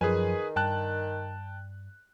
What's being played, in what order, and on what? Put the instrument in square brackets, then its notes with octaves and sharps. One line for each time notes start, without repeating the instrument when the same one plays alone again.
[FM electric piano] F#2 F3 [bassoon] D#3 [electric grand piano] G#4 B4 G#5
[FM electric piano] G2 [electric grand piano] G5 A5 F#6